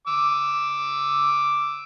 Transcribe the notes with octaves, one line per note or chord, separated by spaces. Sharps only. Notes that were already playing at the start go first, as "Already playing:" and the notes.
D6 E6